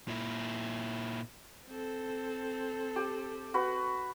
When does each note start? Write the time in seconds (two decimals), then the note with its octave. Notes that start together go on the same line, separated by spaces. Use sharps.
0.08 A#2 E4
1.67 C4 A4
2.96 G4
3.54 F#4 B4